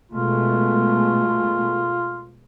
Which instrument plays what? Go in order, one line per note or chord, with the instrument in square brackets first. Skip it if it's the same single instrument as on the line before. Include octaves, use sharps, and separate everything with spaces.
[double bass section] B2 G#3 A3 [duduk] F4